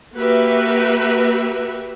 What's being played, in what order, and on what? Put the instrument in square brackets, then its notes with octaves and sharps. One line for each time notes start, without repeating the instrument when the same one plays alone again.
[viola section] A#3 F#4 G4 B4 E5